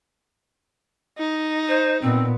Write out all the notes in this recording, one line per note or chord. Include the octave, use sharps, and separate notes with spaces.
D#4
C5
A#2 B3 C4